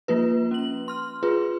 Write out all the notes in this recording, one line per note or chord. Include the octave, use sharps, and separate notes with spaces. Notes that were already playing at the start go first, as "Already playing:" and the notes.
F3 A#3 F4 B4
C#4 F#7
C6 F6
F4 G#4 B4